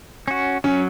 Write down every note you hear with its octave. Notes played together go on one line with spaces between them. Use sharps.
C#4 F#4
F#3 C#4